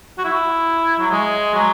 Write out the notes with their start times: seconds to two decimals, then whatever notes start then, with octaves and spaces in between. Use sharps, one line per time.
0.18 F#4
0.24 E4
0.99 F#3
1.11 G#3
1.54 F#3